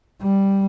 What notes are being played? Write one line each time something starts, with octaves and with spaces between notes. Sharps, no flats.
G3